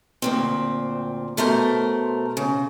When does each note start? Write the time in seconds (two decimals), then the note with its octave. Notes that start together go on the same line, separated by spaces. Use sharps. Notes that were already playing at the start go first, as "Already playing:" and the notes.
0.22 D2 A#2 C4
1.37 B2 A3 A#4 C5
2.37 C#3